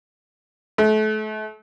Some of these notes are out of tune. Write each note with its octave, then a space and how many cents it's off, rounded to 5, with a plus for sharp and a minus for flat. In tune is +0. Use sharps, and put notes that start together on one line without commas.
A3 -35